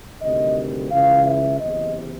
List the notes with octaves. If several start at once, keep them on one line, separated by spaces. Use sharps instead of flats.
D2 C3 D#3 G3 D#5
C#2 C#3 E3 F5
E5
F#1 E2 C3 D#5